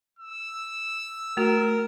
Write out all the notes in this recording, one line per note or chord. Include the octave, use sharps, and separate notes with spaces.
E6
A3 F#4 A#4